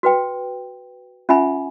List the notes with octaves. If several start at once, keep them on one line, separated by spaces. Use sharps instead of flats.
F#4 B4 G5
C#4 F4 E5 F#5 G#5 B5